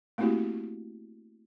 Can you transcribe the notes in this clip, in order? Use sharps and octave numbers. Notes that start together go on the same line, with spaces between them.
A3 A#3 C4 E4 F#4 G4